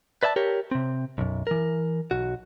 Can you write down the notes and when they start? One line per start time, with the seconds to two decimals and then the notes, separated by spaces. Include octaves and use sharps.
0.23 B4 D5 E5 G#5 A5
0.36 G4 A#4 C#5
0.71 C3 C4
1.18 B1 F#2
1.47 E3 A#4
2.11 B1 F#4